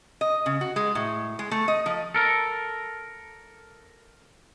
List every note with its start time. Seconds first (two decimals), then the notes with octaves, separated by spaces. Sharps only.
0.21 D#5
0.46 C#3
0.61 F#4
0.76 G#3
0.95 A2
1.39 G#3
1.51 A3
1.68 D#5
1.86 F3
2.15 A4 A#4